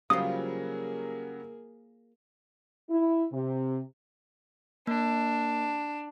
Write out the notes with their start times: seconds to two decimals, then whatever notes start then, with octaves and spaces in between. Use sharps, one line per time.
0.10 C#3 F#3 G3 A#3 F4 G#4 C5 D#6
2.90 E4
3.33 C3
4.87 A#3 D4